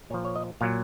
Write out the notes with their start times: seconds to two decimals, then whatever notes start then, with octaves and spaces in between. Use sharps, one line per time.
0.10 A#2 C#5
0.14 F3
0.25 C#5
0.36 D#5
0.61 A#2 F#3 F5